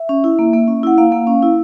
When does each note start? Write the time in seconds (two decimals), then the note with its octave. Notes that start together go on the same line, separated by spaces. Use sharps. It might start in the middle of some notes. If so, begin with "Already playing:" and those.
Already playing: E5
0.09 C#4
0.24 E4
0.39 A#3
0.53 A#3
0.68 C#4
0.83 E4 F#5
0.98 A#3 F5
1.12 A#3
1.27 C#4
1.43 E4